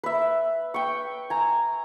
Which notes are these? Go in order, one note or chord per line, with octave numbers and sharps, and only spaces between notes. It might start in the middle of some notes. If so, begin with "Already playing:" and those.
B4 E5
G5 C#6
G#5 A#5